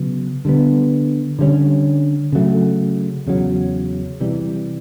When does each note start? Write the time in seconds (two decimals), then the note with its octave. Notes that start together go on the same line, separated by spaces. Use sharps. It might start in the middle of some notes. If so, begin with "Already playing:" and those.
Already playing: C#3 F#3 B3
0.45 D3 G3 B3
1.39 D3 G3 A#3 C#4
2.32 C#3 F#3 A3
3.26 E2 C#3 F#3
4.20 C3 E3 G3